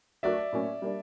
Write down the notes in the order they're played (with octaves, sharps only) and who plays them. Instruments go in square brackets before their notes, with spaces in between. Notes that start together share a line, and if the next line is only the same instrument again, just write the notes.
[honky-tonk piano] F#3 A3 D4 F#4 A#4 [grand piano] D5 E5
[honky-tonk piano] A2 F#3 A#3 C#4
G3 A#3 D4